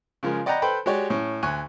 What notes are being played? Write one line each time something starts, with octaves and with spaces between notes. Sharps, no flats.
C#3 F3 G#3 A#4
D5 D#5 F#5 G5 A#5 B5
A4 B4 C5 G5 B5
G#3 F#4 G4 C#5 D5
A2 C#4
D2 G#5 C#6 F#6